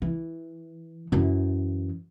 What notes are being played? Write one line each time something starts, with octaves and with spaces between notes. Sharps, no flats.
E3
F#2 E3